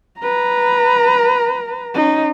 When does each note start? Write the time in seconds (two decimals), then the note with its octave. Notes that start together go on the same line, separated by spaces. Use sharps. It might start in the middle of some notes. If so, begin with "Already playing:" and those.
0.20 B4 A#5
1.94 C#4 D#4